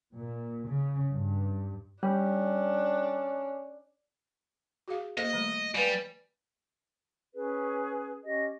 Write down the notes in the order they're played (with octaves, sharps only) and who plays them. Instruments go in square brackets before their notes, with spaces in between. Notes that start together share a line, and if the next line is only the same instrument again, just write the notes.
[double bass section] A#2
C#3
G2
[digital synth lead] G3 [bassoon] C#4 [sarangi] D4
[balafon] F#4 G#4 F5
[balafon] A#3 A4 C5 [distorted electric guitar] D#5
[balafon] D#3 G3 A3
[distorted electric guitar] G3 [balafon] B4 F5 G#5
[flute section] C#4 G#4 B4
C#4 G4 D#5